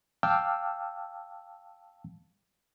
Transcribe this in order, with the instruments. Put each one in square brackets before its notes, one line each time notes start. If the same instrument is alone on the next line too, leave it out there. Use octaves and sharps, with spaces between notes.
[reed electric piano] F5 G5 A5 D6 E6 F6